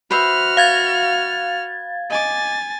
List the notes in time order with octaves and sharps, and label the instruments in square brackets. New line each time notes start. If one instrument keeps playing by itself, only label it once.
[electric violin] F#4 F6 [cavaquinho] B4 C5 E5
[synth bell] F5 G#6 A6
[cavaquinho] D#5 D6 [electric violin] G#5 A6